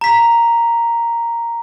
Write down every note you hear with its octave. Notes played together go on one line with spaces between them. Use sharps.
A#5 B6